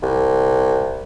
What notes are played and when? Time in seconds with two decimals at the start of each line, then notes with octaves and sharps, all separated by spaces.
0.03 C2